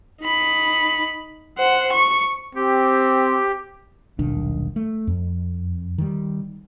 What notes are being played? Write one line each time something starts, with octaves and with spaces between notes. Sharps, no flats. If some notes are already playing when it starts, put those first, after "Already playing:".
D#4 B5
C5 F#5
C#6
C4 G4
D#1 B1 D#3 D4
A3
F2
D#3 G3